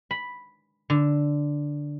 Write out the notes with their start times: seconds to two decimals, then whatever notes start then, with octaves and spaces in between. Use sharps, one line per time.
0.11 B5
0.90 D3